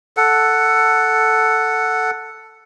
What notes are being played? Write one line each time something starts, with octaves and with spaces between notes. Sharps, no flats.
A4 F#5